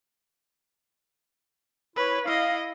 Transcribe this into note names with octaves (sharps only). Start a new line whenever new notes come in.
E4 B4 C#5
E4 D#5 F5